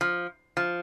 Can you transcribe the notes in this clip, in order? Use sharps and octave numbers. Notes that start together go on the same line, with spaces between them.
F3
F3